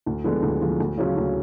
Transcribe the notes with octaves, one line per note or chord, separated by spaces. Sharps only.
D2
D3 F3 G#3 B3
D2
D3 F3 G#3 B3
D2
C#3 F#3 C#4 F4
D2